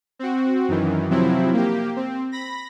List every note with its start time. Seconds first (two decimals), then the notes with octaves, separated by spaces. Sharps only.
0.19 C4 F#4
0.68 F#2 D#3 E3
1.10 C3 F3 F#3 C4 E4
1.53 A#3 G4
1.96 C4
2.32 B5 A#6